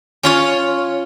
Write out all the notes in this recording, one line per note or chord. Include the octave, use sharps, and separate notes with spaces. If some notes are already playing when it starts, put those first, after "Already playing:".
C#4 F4 C#5